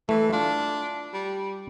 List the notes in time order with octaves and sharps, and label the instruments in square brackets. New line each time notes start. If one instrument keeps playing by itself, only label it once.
[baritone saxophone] E3 [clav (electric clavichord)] A3
[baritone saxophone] D4 [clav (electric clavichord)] F4
[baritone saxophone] G3